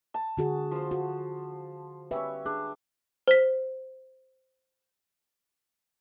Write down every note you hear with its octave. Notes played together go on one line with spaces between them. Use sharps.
A5
D3 F#4 G#4
F3 C5
F#4
G3 C#4 B4 C#5 E5
D4 G#4
C5 B6